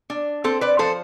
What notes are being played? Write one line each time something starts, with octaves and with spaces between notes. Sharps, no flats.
D4
C4 A4 C5
B4 D5
F3 A4 C5